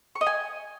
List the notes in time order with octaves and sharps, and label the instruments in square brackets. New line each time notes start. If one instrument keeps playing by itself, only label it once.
[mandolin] C#6
D#5
G#5